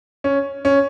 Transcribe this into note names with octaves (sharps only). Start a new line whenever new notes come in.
C#4
C#4